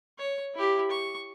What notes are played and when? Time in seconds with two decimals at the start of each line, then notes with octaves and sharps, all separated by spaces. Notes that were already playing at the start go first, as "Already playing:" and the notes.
0.19 C#5
0.55 E4 G4
0.91 C#6